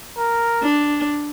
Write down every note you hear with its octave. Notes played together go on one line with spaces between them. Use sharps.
A#4
D4